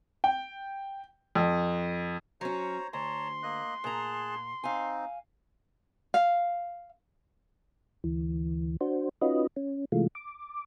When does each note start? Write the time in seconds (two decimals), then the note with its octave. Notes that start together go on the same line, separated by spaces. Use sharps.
0.24 G5
1.35 F2
2.41 F#3 C#4 C5 C#5 A#5
2.93 D2 C#5 A5 A#5 C6
3.43 A#3 D#5 F#6
3.84 A#2 G#4 A5 A#5 F#6
4.64 C4 D#4 F5 G#5
6.14 F5
8.04 D2 E3
8.81 D4 F#4 C5
9.21 C#4 D#4 F4 F#4 B4 D#5
9.56 C#4
9.92 C3 E3 G#3 A3 F4
10.15 D6